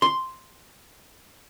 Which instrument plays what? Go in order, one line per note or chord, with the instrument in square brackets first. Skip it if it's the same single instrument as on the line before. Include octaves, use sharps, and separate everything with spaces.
[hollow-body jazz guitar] C6